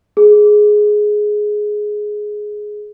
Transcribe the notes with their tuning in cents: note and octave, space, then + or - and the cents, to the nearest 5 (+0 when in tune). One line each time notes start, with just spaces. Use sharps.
G#4 +10